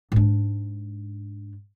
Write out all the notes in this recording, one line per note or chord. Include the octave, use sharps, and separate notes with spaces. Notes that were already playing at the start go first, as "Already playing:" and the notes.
G#2 D4